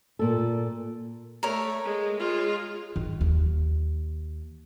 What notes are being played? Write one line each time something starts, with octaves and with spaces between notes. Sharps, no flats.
A#2 A4
A3 A#4 C#5
G#3
G#3 F4
D#3
D#2